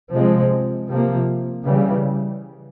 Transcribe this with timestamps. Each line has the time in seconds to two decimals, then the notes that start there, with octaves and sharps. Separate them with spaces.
0.12 C3 F3 G#3 C4
0.88 C3 F3 A#3
1.65 C#3 E3 G3